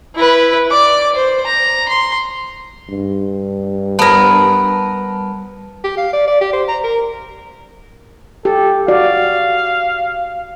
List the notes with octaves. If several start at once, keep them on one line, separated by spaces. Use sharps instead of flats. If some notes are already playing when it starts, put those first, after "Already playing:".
E4 B4
D5 D6
C5
A#5
C6
G2
G3 B3 A#4 A5
G4
F5
D5
D5
G4
C5
A#5
A#4
G4 A4
F#4 D5 F5